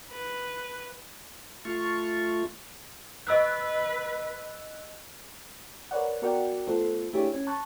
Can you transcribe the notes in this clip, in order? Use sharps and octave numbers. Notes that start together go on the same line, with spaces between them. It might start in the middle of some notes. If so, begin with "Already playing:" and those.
B4
A3 F4 C#6
B4 D#5 E6 F#6
A#4 B4 C#5 D5 F#5
B3 F#4 A#4 D5 F#5 G5
A3 B3 F4 A4 C5
A3 D4 E4 G4 G#4 C#5
C#4
A5 C#6 F#6